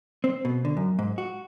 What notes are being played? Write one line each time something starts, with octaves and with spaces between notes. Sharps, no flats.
C4
B2
D3
F#2
G#2
F#4